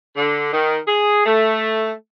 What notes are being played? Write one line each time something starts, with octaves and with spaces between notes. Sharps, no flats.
D3
D#3
G#4
A3